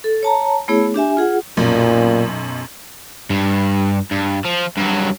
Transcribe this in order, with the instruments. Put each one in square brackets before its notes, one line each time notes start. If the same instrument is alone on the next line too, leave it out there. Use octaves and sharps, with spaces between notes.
[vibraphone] A4
C#5 A5 A#5
A3 B3 E4 G#4 C#5
D4 G4 E5 G#5
F4 G#4 F#5
[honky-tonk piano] B1 F#2 [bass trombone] A#2
[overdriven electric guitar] G2
G2
F3
G2 F#3